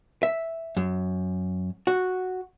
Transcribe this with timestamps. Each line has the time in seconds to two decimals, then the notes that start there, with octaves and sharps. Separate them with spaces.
0.23 E5
0.77 F#2
1.87 F#4